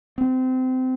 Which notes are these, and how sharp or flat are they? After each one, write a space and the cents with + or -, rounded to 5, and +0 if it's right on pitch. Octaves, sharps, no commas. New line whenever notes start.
C4 -25